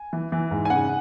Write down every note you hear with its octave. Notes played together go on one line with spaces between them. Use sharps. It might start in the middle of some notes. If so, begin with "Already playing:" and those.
Already playing: G#5
E3
E3
G#2
G#5
C#3 F#5